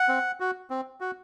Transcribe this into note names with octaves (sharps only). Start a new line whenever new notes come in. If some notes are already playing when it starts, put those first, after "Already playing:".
Already playing: F#5
C4
F#4
C4
F#4